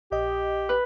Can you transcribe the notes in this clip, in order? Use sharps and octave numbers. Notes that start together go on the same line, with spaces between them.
A#1 G4 D#5
B4